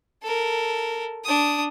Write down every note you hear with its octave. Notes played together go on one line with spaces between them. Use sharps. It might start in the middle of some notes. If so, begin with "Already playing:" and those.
A4 A#4
D4 D#6